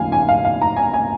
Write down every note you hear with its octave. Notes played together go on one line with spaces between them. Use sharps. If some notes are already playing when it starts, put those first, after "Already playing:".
Already playing: D#2 C#3 F3 F5 G#5
G#5
F5
F5
A#5
G#5
G#5